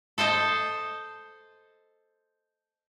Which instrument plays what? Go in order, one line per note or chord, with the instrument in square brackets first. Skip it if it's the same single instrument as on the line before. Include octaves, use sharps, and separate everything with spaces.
[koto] A4 C5 D#5 A5